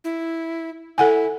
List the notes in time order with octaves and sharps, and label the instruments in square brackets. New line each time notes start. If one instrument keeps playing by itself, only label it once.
[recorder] E4
[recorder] E4 [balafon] A4 F#5 G#5